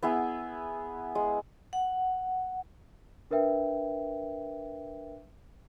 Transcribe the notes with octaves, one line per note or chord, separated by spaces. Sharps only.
B3 E4 G#4 E5
G#3
F#5
D4 A#4 B4 E5 G5